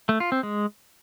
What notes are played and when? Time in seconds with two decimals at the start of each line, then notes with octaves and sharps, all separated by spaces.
0.09 A3
0.20 F4
0.32 C4
0.43 G#3